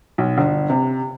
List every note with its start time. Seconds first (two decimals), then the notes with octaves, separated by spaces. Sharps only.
0.18 B1
0.38 G1
0.70 C3